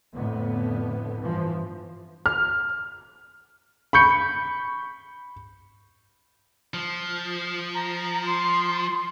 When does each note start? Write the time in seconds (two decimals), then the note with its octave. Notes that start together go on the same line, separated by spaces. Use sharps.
0.15 F2 A2 D3 B3
1.20 G2 E3 F3
2.26 F6
3.93 B5 C#6 G6 C#7
6.74 F3
7.75 A#5
8.26 C6